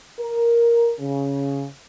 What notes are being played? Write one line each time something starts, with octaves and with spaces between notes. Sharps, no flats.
A#4
C#3